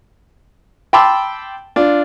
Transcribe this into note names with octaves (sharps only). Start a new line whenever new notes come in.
G5 A5 B5 C6 D6 E6
D4 F4